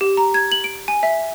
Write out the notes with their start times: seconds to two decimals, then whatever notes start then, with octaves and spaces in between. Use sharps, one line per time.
0.01 G4
0.17 A#5
0.34 G#6
0.52 F#7
0.64 D7
0.88 G#5
1.03 E5